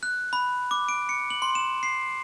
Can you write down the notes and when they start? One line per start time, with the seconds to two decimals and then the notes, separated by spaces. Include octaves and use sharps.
0.03 F#6
0.33 B5
0.71 D6
0.89 D7
1.09 C#7
1.30 F#7
1.42 C6
1.55 E7
1.83 C7